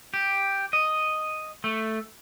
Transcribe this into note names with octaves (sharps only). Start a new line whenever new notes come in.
G4
D#5
A3